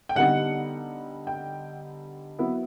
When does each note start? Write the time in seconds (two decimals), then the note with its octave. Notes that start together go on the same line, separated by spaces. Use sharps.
0.09 G5
0.15 D3 G3 B3 D#4 F#5
1.27 G5
2.39 F#3 B3 E4